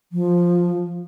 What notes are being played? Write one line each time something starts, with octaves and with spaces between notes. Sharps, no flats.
F3